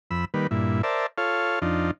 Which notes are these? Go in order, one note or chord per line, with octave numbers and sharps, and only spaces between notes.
F2 B5 E6
D#3 G3 A#3 B4
G2 A#2 E4
A#4 C5 D5 E5 A5
F4 A4 C#5 F5
F2 D4 D#4 F4